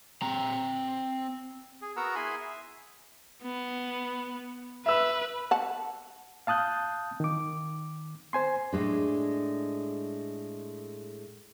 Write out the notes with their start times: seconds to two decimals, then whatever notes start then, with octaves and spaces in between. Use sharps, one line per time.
0.22 C4 A#5
1.82 G#4
1.97 B3 F#4 A#4 F#5 A#5 E6
2.15 E4 G#4 G#5 B5 C6
2.40 E5
3.43 B3
4.86 B4 E5 E6
5.51 F#5 A5
6.47 F5 A5 D#6 F#6 G6
7.20 D#3 D6
8.33 C5 G#5 C6
8.73 A2 G#3 D4